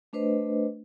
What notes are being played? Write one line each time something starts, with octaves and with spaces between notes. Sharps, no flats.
A3 D4 B4 C5 D#5